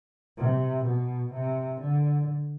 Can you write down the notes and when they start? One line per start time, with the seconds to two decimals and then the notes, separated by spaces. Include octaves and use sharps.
0.37 C3
0.85 B2
1.33 C3
1.81 D3